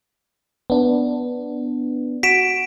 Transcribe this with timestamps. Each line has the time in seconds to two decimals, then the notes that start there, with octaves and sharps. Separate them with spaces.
0.70 B3 D4
2.23 F#4 B6 D7 E7